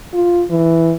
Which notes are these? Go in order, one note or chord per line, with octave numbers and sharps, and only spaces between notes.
F4
E3